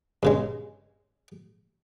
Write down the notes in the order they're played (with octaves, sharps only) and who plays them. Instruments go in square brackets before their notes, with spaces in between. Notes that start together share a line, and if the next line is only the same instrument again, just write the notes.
[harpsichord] G2 C#3 G#3